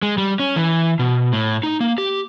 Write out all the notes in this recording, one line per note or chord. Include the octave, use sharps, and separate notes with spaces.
G#3
G3
C#4
E3
B2
A2
D#4
A#3
G4